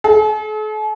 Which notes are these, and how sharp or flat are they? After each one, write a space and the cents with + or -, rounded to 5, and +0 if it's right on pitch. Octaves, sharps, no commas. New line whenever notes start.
A4 -45